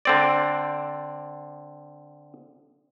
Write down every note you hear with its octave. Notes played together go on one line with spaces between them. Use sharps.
D3 C4 D5